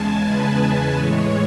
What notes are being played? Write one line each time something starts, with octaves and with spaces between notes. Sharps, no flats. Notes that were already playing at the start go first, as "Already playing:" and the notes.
Already playing: E2 C#3 G#3 G#5 A5
B4
B4
A2 E3 G#3 C#5